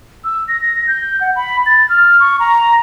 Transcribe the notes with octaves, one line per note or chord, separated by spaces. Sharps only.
E6
A#6
G6
F#5
B5
A6
F6
C#6
A#5